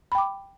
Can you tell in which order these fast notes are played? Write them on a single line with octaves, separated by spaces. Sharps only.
B5 G5 D6